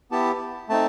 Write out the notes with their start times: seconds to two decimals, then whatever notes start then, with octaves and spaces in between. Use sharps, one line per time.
0.11 B3 E4 G4 A5
0.69 A3 C4 D#4 A5